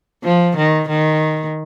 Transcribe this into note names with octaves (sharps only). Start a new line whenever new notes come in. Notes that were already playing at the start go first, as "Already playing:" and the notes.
F3
D#3
D#3